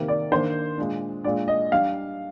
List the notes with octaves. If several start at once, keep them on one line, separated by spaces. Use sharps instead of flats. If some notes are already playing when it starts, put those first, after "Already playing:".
Already playing: C3 D#3 A#3
D5
D#3 A#3 D4 C5
A#2 G#3 D4
A#2 G#3 D4 D5
D#5
G3 D4 F5